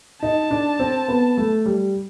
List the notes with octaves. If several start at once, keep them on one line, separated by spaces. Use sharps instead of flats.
D#4 A5
D4
C4
B3
A3
G3